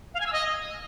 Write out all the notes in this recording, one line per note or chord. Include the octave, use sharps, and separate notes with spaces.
F5
G#5
E6
D#5